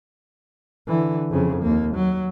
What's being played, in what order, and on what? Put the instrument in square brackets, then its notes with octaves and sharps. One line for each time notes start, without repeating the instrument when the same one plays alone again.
[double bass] D3 E3
F2 C#3
D#2 A#3
F#3